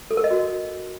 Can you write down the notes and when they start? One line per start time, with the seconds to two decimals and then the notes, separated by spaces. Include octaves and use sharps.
0.11 A4
0.17 A#4
0.24 D#5
0.31 F#4